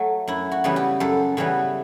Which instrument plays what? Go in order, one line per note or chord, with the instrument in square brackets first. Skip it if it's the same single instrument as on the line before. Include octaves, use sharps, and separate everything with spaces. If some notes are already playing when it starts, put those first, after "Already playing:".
Already playing: [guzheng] F#3 A3
F#2 E4
F#4
C#3 E3 G3 B3
G4
F#2 A4
C#3 E3 G3 B3